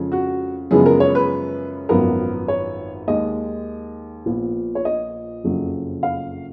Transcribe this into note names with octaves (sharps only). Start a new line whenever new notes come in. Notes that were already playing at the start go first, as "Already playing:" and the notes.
Already playing: F2 C#3 F3 G#3
F#4
F#2 C#3 F3 G#3 B3 G#4
A#4
C#5
B4
G#1 F#2 F3 B3 A#4
C#5
D#2 D#3 G#3 D#5
A#1 A#2 F3 B3
C#5
D#5
F#1 F2 C#3 F#3
F5